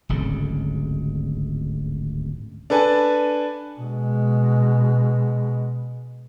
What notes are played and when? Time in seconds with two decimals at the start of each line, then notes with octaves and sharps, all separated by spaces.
0.09 D1 G#1 C#2 D3
2.70 D4 A4 B4 G#5 A5
3.80 B2 G#3